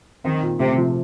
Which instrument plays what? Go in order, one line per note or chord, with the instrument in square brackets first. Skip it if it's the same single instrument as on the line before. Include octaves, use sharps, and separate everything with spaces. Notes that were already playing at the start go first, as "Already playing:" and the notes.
[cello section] D#3 [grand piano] C4
[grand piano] A#2
[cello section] C3 [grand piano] A3
[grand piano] F3